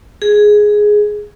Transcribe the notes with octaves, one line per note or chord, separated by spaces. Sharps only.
G#4